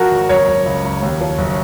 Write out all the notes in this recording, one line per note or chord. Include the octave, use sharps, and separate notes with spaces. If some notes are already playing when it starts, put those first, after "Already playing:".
Already playing: F3 F#4 A#4
G#1
F#1 A#4 C#5
F#1
C#2
C#2
D#2
F3
F#1